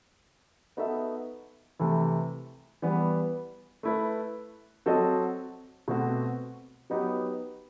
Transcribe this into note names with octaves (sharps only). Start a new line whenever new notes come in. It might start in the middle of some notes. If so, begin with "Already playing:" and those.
B3 D#4 F#4 A4 E5
C3 E3 A3 E4
E3 G3 B3
A3 E4 B4
F#3 C4 F#4 A4 D#5
B2 A3 C4 F#4
F#3 B3 D#4 G4